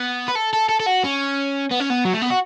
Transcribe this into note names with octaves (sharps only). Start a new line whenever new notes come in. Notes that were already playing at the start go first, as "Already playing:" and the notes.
Already playing: B3
B4
A4
A4
A4
A4
F#4
C#4
B3
C#4
B3
F#3
A3
B3
F#4